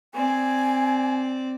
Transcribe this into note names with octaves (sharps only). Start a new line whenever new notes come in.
C4 D5 G#5